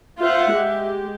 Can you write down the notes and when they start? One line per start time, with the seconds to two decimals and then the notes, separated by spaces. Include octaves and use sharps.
0.20 F4 C5 E5 F#5
0.53 G#3 G4